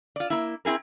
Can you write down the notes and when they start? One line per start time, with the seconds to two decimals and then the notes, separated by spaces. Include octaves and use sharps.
0.16 F4 D5
0.30 A#3 E4
0.65 C4 E4 G#4 A#4